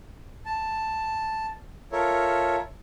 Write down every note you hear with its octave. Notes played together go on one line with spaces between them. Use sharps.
A5
F4 A4 A#4 C#5 E5